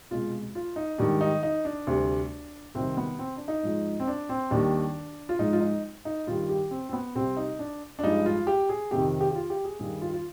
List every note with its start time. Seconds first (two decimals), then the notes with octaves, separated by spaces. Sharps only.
0.11 C2 B2 G#3 F4
0.55 F4
0.76 D#4
0.98 G#2 D#3 G3 D4
1.21 D#4
1.43 D#4
1.65 D4
1.87 D2 C3 G3
2.75 C2 C3 D#3 G3 C4
2.97 B3
3.19 C4
3.37 D4
3.48 D#4
3.63 G#2 F3 G#3
4.00 C4
4.07 D4
4.29 C4
4.51 D#2 D#3 G3 D4
5.29 F4
5.39 G#2 F3 G#3 D#4
5.53 F4
5.61 D#4
6.05 D#4
6.27 G2 D#3 G3 F4
6.49 G4
6.71 C4
6.89 C4
6.93 B3
7.15 C2 C3 G3 C4
7.37 D#4
7.59 D4
7.99 D4
8.04 G2 F3 G#3 D#4
8.26 F4
8.47 G4
8.69 G#4
8.91 F2 C3 D#3 G4
9.21 G4
9.31 G4
9.35 F4
9.50 G4
9.64 G#4
9.79 G2 D#3 G3 G#4
10.02 F4
10.13 F4